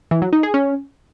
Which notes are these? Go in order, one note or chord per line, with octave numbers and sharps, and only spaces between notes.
E3
F#3
D#4
G#4
C#4